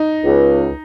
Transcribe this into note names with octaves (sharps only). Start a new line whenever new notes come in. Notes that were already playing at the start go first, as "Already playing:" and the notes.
Already playing: D#4
C#2